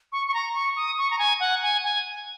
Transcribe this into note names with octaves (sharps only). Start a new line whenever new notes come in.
C#6
C#6
A#5
C#6
D#6
C#6
A#5
G#5
F#5
G#5
G#5